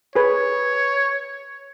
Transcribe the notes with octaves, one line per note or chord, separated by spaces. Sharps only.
G#4 B4 C#5